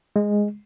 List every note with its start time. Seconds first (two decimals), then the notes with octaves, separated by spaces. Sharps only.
0.16 G#3